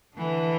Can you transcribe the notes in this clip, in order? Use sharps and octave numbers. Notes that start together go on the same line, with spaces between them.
D3 E3